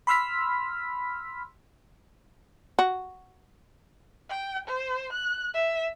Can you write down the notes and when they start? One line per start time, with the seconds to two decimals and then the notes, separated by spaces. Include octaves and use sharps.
0.07 B5 C6 E6 F6 B6
2.79 F#4
4.29 G5
4.68 C5
5.13 F#6
5.54 E5